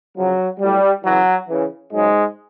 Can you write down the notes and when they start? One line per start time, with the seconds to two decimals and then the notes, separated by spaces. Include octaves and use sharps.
0.16 C#3 F3 F#3
0.60 A2 F#3 G3
1.04 C#3 E3 F#3
1.48 C#3 E3
1.92 G#2 C#3 F#3 G#3